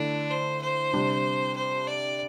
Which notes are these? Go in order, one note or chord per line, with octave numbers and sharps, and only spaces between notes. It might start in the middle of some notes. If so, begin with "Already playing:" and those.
Already playing: D3 A3 D4 E4
C5
C5
C3 G3 D4
C5
D5